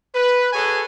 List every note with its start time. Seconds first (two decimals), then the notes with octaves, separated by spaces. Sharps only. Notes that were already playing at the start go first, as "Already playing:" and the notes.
0.15 B4
0.53 F#4 G#4 A4 C#5 G#5